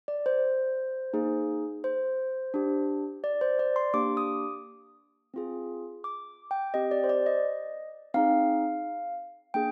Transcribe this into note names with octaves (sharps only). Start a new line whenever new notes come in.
D5
C5
A#3 D#4 G#4
C5
D4 G4
D5
C5
D5
C6
A#3 D4 G4 D6
D#6
C4 F4 G#4
D6
G5
C4 G4 D#5
D5
C5
D5
D#5
C4 D#4 G#4 F5
A#3 D4 G#4 G5